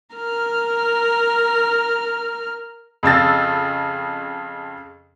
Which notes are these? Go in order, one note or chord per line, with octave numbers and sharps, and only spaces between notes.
A#4 F6
F2 C#3 E6 A6